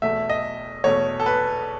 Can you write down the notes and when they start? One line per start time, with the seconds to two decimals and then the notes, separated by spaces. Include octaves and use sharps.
0.02 E2 B2 A3 E5
0.30 D#5
0.84 E2 B2 A3 C#5
1.20 A4
1.26 B4